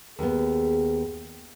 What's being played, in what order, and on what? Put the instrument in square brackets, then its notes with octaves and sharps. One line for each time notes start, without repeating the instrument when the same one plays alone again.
[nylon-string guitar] D#2 B3 [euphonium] G#4